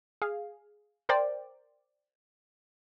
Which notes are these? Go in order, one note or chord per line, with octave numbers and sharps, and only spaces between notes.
G#4 F5
A#4 C5 D5 G5